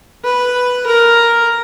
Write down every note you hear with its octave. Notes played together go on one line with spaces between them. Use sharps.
B4
A#4